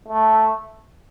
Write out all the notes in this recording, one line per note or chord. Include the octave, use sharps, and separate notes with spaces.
A3